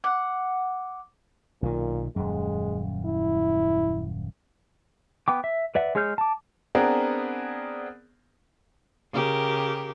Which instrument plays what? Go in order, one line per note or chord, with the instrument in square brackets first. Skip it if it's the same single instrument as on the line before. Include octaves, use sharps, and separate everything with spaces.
[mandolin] F#5 [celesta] D6
[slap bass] B1 D#3 [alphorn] A#2
[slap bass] D#1 F#2 [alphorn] G#3
[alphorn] E4
[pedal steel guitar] B3 G5 D6
E5
B4 D5 E5 F#5
G#3 G#4 C#5 F6 G6
A5 D6
[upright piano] B3 C4 D4 G#4 A#4
[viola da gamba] C#3 G4 A#4